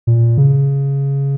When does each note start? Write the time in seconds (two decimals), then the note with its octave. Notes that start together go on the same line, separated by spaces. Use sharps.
0.07 A#2
0.38 C#3